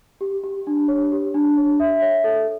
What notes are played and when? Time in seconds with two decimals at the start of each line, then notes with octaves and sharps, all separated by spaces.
0.21 G4
0.44 G4
0.67 D4
0.88 C#5
1.12 G4
1.34 D4
1.57 C#5
1.80 E5
2.02 C#5
2.24 A4